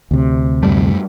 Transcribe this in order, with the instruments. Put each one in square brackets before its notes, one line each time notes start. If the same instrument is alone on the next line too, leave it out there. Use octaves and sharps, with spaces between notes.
[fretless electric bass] D2 C3
[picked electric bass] F#2 G3 A3